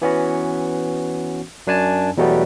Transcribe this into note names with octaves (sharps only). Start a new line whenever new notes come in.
E3 B3 C#4 F#4
F#2 D4 G#5 A5
E2 B2 F#3 G3 A3 B3